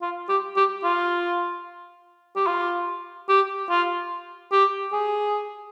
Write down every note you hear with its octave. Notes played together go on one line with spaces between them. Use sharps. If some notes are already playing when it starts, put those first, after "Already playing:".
F4
G4
G4
F4
G4
F4
G4
F4
G4
G#4